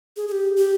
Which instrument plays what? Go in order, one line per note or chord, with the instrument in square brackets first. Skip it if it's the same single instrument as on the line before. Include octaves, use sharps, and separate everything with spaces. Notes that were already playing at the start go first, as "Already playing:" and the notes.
[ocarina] G#4
G#4
G4
G4